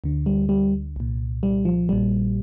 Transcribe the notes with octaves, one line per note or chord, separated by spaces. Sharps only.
D2 D3
G3
G3
C2 A#2
G3
F3
A#1 A#2 G3